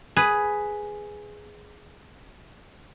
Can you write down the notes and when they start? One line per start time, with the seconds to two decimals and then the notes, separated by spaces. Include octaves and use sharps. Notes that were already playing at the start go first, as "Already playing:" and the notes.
0.17 G#4 B4